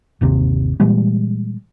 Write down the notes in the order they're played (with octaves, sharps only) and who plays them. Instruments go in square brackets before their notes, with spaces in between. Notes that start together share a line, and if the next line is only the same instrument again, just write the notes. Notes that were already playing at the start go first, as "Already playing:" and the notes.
[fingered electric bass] G1 D#2 C3
A#2 E3 G3 G#3